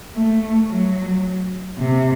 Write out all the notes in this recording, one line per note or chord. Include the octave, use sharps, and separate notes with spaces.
A3
F#3
C3